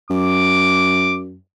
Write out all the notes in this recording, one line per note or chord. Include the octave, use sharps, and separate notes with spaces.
F#2 D6